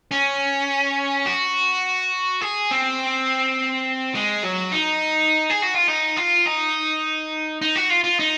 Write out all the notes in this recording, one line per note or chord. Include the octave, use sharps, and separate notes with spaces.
C#4
F#4
G#4
C4
G#3
F#3
D#4
G#4
F#4
F4
D#4
F4
D#4
D#4
F#4
F4
F4
D#4